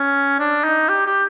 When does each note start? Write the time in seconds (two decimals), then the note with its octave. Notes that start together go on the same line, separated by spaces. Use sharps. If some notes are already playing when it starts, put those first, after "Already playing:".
Already playing: C#4
0.39 D4
0.64 D#4
0.89 G4
1.06 G4